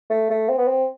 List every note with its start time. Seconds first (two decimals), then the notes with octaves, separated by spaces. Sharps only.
0.10 A3
0.30 A3
0.49 C4
0.58 B3
0.68 C4